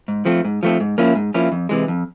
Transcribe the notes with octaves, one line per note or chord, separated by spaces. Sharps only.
G#2
F3 A3 C4
G#2
F3 A3 C4
G#2
F3 A#3 C#4 E4
G#2
F3 A#3 C#4 E4
F2
C3 E3 G#3
F2